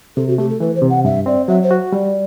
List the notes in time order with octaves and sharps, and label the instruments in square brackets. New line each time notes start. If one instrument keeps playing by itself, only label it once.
[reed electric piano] C3 [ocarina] A4
[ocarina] F#4
[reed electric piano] A3 [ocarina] G4
[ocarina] A4
[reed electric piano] E3 [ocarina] B4
[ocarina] C5
[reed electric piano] C3
[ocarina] F#5
[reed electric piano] G2 [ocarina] E5
[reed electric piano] C4 [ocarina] D5
[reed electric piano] F#3 [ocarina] E5
[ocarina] C5
[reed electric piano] F#4
[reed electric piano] G3 [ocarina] D5